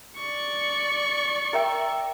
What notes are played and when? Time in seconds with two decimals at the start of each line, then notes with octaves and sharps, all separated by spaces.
0.17 D5 C#6
1.53 A#4 E5 G5